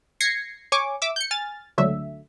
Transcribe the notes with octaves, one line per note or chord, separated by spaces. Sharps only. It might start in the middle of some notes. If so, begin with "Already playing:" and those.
G#6 A#6 C7 C#7
C#5 G#5 C#6 D6
E5 D6 E6
G6 C#7
G#5 F6 A6
C#2 D3 F#3 A3 E5